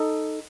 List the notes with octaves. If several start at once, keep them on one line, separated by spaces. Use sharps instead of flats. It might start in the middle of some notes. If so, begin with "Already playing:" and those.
Already playing: D#4 A4